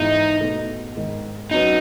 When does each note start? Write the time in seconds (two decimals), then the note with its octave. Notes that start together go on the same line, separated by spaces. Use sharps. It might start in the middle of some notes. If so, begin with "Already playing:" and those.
Already playing: G#2 E3 B3 D#4 E4
0.40 B2 A3 D#4 A4
0.96 G#2 D#3 G#3
1.51 F#3 C#4 D#4 F#4 B4